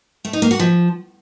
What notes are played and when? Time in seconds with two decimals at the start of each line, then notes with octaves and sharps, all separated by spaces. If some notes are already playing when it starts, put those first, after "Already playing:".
0.25 A3
0.33 D#4
0.42 A#3
0.51 F#4
0.59 F3